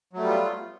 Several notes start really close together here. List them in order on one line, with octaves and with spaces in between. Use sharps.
F#3 A3 G3 B3 F4